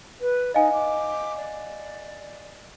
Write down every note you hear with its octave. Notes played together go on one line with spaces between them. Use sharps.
B4
D#4 D#5 F5 G#5
D6
D5